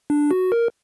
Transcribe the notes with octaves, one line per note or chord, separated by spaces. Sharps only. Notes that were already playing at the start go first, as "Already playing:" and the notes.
D4
F#4
A#4